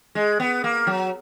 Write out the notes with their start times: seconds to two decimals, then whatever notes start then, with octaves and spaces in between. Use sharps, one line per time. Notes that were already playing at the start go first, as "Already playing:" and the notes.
0.15 G#3
0.40 B3
0.64 A#3
0.87 F#3